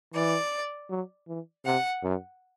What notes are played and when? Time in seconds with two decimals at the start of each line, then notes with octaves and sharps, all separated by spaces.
0.14 E3 D5
0.90 F#3
1.28 E3
1.65 C3 F#5
2.03 F#2